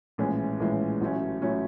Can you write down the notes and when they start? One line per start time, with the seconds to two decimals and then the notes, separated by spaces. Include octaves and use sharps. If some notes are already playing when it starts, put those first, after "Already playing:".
0.18 A#1 A2 E3 G#3 C#4
0.60 A#1 A2 E3 G#3 C#4
1.01 A1 A2 F#3 A3 C#4
1.42 A2 F#3 A3 C#4